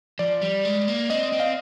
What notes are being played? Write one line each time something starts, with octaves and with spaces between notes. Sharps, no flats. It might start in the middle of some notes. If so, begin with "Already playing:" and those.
F3 D5
G3
G#3
A#3
C4 D#5
C4
F5